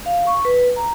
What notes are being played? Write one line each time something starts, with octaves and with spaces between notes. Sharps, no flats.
F5
C#6
B4
A#5